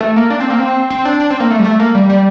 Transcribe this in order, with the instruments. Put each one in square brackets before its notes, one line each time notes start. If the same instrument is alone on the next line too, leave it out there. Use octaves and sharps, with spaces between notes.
[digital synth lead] A3
A#3
D4
C4
A#3
C4
C4
D4
D4
C4
A#3
A3
G3
A3
A#3
G3
G3